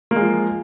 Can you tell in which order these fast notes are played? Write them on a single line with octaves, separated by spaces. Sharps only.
A#3 G#3 F3